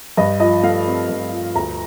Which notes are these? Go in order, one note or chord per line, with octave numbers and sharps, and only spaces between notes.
G2 D#5
F3 D#5
A3 F5
C4
G2
F3
D2 A#5